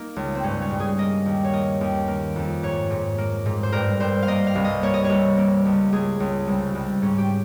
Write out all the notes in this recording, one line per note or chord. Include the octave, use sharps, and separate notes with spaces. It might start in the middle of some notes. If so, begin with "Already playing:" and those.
Already playing: A#3 D#4
C#2
C4
G2 C#4
C#4
G2
G#4
A#3 D#5
D#2
C#5
A#3 D#5
D#2
A#3
F2
G#2 C#5
G#2
A#3
G#2
C5
G2 A#4
G2 C5
F5
A#3 D#5
F5
C2
D#5
A#3 C#5
D#5
C#5
C2
A#3
C#2
C#2 G#4
C#2
C2
C2
G#2 C#4
G4